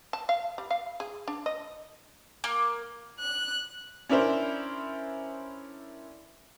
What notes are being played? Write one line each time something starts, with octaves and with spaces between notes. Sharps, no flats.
A5
F5
G3
F5
G#4
D4
D#5
A#3
F#6
C#4 D4 E4 A#4 C5